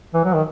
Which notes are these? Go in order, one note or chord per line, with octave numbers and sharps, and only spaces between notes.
E3
F#3
D#3